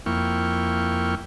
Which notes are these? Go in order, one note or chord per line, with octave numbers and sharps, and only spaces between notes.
F2 A#3 E4 G5 C#6 F6